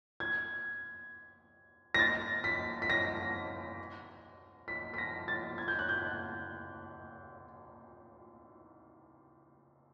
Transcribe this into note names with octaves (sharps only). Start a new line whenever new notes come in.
G#6
A#6
A6
B6
B6
A#6
B6
B6
A#6
A6
G#6
G6
F#6
G6